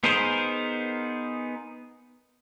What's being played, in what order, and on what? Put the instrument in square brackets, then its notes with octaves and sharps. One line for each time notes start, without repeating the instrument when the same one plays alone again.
[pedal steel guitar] B3 D#4 G#4 A#4 C5